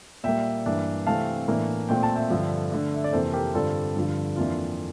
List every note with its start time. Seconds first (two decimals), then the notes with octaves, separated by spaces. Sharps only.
0.24 A#2 G3 A#3 E5 G5
0.66 G2 E3 A#3 D4
1.06 C3 E3 A3 C4 F5 A5
1.48 A2 E3 A#3 D4
1.89 A#2 A3 C4 G5
2.03 A5
2.15 E5 G5
2.30 G2 D3 F3
2.71 D3 A3 D4
2.94 E5
3.04 D5
3.13 F2 C3 E3 A#3 A4 C5
3.34 G4 A#4
3.54 G2 D3 G3 C4 F4 A4
3.96 G2 D3 F3
4.36 F2 E3 A#3 D4 F4